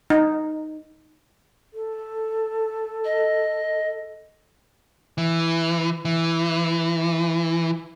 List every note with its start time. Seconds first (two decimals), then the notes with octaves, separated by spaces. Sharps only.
0.10 D#4
1.74 A4
3.05 D#5
5.18 E3
6.05 E3